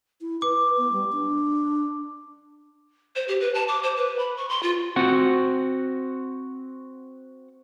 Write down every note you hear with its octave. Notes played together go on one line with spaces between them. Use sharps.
E4
B4 D6
B3
G3
D4
C5
G4
B4
A5
D6
C5
B4
B5
C#6
C6
F4
C4 F#4 F#5